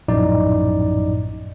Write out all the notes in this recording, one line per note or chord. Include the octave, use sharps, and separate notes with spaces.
A#1 F#2 A2 D#4 D5